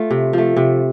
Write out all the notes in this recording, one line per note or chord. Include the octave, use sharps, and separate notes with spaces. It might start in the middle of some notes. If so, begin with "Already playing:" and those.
Already playing: A3 F4
C3
F3 A3
C3